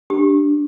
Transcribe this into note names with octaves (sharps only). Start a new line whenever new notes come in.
D4 G4